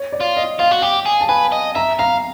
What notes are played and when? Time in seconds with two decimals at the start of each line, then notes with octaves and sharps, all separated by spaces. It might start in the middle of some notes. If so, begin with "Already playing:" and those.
Already playing: C#5
0.12 D5
0.21 F4
0.37 D#5
0.59 F4 F5
0.71 F#4
0.82 G4 G5
1.06 G#4
1.21 A5
1.29 B4 G#5
1.52 D#5
1.75 E5 A#5
1.99 F5 A#5